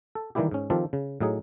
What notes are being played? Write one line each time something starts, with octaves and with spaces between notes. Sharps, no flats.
A4
D#3 E3 G3 A#3 E4 G4
G#2 C#4
D#3 F3 C4 F4 G4 A4
C#3
A2 F#3 D#4 G#4